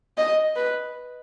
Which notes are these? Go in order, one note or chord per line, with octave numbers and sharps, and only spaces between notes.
D#5
B4